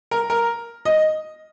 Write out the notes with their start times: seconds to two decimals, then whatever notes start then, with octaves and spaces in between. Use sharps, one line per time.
0.11 A#4
0.30 A#4
0.85 D#5